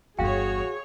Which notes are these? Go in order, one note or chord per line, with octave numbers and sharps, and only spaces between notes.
G1 E2 F#4 G#4 C#5 F5 G5